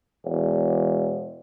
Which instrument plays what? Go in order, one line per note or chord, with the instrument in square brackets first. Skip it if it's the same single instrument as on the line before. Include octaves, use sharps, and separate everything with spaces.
[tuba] E1